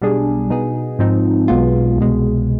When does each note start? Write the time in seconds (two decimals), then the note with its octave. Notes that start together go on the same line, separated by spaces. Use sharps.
0.01 B1 B2 G3 D4 G#4
0.50 B2 B3 D#4 G#4
0.99 G#2 F3 C4 D#4
1.48 B1 B2 G#3 B3 F4
1.97 C2 B2 G#3